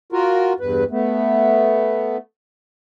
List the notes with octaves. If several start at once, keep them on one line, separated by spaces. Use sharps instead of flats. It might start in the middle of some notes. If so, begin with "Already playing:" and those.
F4 F#4 A#4
E2 G2 B4
A3 B3